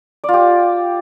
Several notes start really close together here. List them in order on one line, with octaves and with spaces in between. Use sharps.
D5 F4 G4